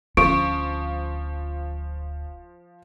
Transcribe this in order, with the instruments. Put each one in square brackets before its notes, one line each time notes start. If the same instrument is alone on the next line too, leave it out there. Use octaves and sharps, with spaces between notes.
[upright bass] D1 C#4 [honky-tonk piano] F3 [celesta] C#6 D7